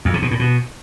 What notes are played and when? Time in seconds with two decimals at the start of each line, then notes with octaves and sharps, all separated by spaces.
0.05 F2
0.14 C3
0.22 B2
0.31 A2
0.39 B2